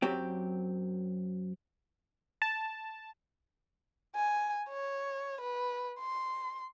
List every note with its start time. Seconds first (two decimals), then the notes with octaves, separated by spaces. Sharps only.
0.02 F#2 F#3 C4 G4
2.42 A5
4.15 G#5
4.69 C#5
5.41 B4
5.99 C6